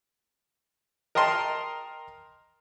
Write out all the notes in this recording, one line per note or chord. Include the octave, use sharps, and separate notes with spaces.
A#4 D#5 G5 A5 C6